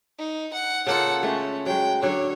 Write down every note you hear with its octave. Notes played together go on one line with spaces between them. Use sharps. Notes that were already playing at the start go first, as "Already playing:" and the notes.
D#4
F#5
C#3 A#3 F4 A4 F#5
G#3 A3 C#4
F#3 G#3 G5
D3 F#3 D4 C#5